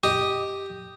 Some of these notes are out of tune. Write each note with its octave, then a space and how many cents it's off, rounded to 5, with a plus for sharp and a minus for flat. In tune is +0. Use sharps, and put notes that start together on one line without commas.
G4 +0 D#5 +0 D#6 +0